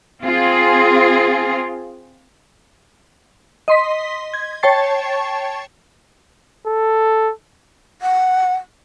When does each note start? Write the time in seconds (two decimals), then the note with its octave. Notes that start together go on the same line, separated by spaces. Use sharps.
0.22 C4 F4 G#4
3.68 D#5 C6 B6
4.34 G#6
4.63 C#5 G5 A5 C#6 A6 C7
6.67 A4
8.02 F#5